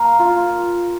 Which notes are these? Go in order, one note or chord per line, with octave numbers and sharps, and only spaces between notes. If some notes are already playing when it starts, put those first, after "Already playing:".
Already playing: A#3 F5 A#5
F4